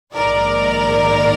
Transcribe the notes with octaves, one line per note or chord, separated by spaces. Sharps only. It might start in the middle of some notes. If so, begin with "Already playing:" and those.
A#1 G#2 D#3 A#4 D5